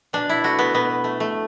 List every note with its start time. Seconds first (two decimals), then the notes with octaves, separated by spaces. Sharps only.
0.13 B2 D4
0.29 E4
0.44 A3 F#4
0.59 B3
0.74 B2 B3
1.04 A3
1.20 A3